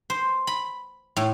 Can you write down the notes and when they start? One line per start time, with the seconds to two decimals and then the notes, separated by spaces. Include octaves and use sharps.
0.10 C5
0.47 B5
1.17 A2